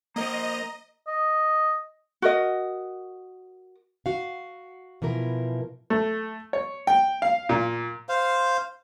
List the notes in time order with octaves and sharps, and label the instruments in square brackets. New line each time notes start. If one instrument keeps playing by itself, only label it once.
[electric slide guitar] A#3 A#4 C5 [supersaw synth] D#5 [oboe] A#5
[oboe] D#5
[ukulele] F#4 A#4 D#5
[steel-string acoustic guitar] F#4 F5
B2 E3 F3 A#4
[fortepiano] A3
C#5
G5
F5
A#2
[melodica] C5 F5